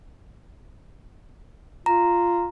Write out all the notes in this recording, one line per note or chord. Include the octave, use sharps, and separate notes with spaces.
F4 A#5